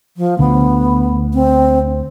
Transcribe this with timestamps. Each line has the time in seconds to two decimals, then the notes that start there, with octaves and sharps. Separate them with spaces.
0.17 F3
0.39 D2 D3 B3
1.34 C4